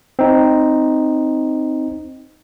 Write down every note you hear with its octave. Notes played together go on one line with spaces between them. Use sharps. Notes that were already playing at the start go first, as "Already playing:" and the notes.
C4 D#4